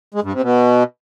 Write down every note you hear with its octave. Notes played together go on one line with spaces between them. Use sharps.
G#3
G2
C3
B2